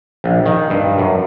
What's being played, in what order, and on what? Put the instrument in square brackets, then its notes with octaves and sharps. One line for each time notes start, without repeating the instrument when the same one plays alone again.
[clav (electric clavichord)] A#1
D#3
G2
F#2